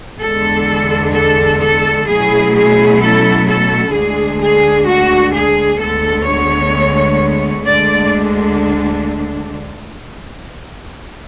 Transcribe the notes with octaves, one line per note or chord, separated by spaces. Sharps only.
E2 D3 G#3 B3 D4 A4
A4
A4
B2 F#3 A3 C#4 E4 G#4
G#4
A4
A4
D2 D3 G#3 D4 G#4
G#4
F#4
G#4
D2 D3 G#3 B3 A4
C#5
D2 D3 G#3 D4 D5